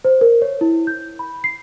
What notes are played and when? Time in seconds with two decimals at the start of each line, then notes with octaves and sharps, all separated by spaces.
0.05 C5
0.21 A#4
0.42 C#5
0.61 E4
0.87 G6
1.19 B5
1.44 C7